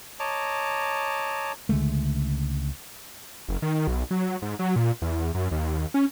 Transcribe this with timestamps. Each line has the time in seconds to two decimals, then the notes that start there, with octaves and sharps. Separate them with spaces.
0.20 C#5 D#5 A5 A#5 D6
1.69 C#2 D3 G#3 A3
3.48 F#1
3.62 D#3
3.87 B1
4.11 F#3
4.42 G#2
4.59 F#3
4.76 A#2
5.02 E2
5.35 F#2
5.51 D#2
5.94 C#4